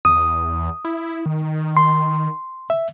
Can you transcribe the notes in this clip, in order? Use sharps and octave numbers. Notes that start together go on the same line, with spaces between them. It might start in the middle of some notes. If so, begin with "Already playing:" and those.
E2 D#6
E4
D#3
C6
E5